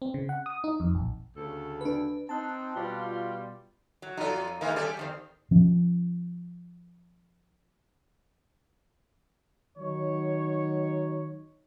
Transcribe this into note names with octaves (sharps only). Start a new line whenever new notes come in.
C4
C#3
F#5
D#6
D#4
F2
A#1
D2 C#3 A4
D4 B4
C4 D#4 A5 F#6
B2 G3 F4
F#3
F2 F#3 D#4 F4 A4
D#3 G#3 A#3 D#4
G3 C#4 G4 A4 D5
F2 D#3 C4
F3 C#4
D#3 F#3 D#4 C#5